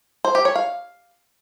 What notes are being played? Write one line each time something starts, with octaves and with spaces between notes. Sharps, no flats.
C5
G4
C#5
F5